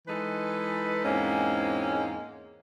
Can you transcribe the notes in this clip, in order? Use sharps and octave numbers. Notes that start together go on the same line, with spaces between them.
E3 G#3 D#4 A4 B4
E2 G#2 G#3 A#3 C4 C#4